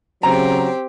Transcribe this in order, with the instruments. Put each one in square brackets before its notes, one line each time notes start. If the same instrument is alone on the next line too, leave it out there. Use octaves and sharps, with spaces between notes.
[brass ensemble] C#3 F#3 [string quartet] C4 G4 [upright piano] A#5